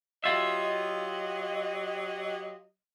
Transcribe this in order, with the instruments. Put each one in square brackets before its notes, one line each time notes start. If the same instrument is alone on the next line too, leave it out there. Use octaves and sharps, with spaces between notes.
[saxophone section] F#3 G4 D#5 [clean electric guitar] F4 E5